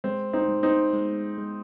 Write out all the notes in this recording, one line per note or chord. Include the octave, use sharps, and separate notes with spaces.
G#3 C4
C4 D#4
G#3
C4 D#4
G#3
G#3